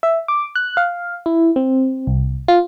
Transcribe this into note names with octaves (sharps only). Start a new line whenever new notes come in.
E5
D6
F#6
F5
E4
C4
C2
F4